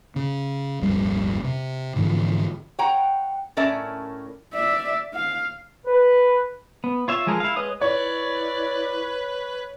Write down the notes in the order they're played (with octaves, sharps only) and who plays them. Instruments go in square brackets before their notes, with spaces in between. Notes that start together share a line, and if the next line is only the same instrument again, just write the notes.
[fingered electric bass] C#3
D#1 G#1 F2 G3
C3
G#2 D3 E3 F3
[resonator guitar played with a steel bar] C#5 F#5 G5 A#5
A2 C#4 A#4 D5 E5 A5
[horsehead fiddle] D5 E5
F5
[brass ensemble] B4
[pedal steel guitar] B3
F4 C#5 E5
F3 G#3 G#4 A#4
E4 F5
G#3 B4 C#5 D#6
[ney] E4 [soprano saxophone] B4 [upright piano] C#5 [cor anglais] D5